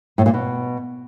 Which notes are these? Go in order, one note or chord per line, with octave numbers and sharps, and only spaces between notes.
A2
A#2
B2